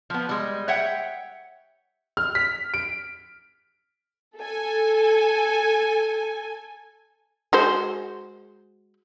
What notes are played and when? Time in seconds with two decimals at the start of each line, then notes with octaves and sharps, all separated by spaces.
0.10 F3 B3
0.29 G3 G#3
0.68 C#5 E5 F#5 G5
2.17 F6
2.35 B6
2.74 D7
4.37 A4 G#5
7.53 G#3 F#4 C5